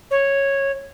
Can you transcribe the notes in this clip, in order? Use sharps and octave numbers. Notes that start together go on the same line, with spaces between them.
C#5